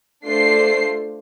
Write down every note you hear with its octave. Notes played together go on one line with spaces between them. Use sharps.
A3 D4 F4 C5 C7